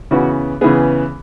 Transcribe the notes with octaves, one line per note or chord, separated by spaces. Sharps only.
C#3 E3 B3 F#4
C#3 E3 B3 G#4